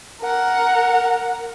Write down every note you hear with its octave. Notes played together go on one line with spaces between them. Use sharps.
A#4 F#5